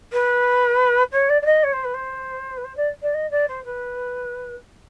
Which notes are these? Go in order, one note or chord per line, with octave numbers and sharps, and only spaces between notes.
B4
C#5
D5
D5
D#5
C#5
C5
B4
C5
B4
C5
D5
D5
D#5
D5
C5
B4